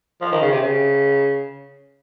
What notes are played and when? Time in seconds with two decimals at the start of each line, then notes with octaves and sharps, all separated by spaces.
0.21 F3
0.32 D#3
0.42 C#3
0.52 C3
0.63 C#3